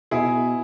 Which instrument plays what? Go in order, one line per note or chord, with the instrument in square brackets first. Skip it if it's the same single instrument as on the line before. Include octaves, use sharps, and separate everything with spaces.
[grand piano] B2 [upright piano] E4 G#4